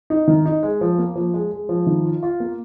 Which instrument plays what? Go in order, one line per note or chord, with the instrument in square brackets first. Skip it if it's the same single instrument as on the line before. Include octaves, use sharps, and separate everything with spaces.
[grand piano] D#4
D#3
D#4
G#3
F3
A#3
F3
G#3
G#3
F3
D#3
F4
F4
A#3